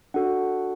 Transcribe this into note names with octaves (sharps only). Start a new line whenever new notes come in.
D4 F#4 A4 F#5